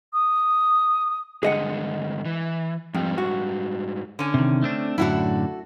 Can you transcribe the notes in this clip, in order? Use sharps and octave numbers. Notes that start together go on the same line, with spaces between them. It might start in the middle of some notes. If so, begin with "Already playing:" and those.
D#6
G2 D3 G#3 G#4 D#5 F#5
E3
F2 G#2 G3
F#4
D3 C#4
C3 D#3
A3 C4 D4
F#2 A2 D3 E4 F#4 A4